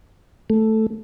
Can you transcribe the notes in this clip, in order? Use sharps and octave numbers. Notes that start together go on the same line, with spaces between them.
A3